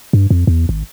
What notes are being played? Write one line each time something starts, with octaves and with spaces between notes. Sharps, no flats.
G2
F2
E2
G#1